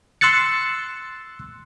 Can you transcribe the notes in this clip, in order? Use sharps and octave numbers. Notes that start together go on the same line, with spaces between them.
C6 E6 F#6 A6 C#7